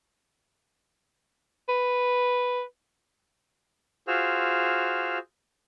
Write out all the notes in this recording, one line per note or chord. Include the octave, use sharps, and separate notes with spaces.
B4
F4 F#4 G#4 C5 E6 F6